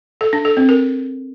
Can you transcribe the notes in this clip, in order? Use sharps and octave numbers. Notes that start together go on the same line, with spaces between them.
A4
D4
A4
C4
A#4